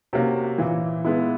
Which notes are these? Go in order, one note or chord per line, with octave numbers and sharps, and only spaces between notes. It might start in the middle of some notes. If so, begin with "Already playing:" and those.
C3 A#3 C#4 F#4
A#2 E3
G#3 B3 E4